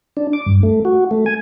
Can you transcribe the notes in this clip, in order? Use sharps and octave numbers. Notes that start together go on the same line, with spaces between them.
D4
D6
G2
A3
F#4
A3
G#5